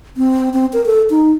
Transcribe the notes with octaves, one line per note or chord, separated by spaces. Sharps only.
C4
C4
A#4
A4
D#4